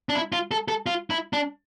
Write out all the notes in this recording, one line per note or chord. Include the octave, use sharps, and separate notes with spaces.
D4
E4
F4
A4
A4
F4
E4
D4